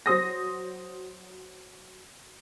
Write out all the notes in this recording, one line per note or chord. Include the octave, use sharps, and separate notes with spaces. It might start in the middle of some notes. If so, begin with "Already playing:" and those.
F#3 C5 D#6 A#6